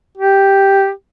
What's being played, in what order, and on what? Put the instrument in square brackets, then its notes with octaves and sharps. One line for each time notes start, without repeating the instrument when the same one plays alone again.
[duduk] G4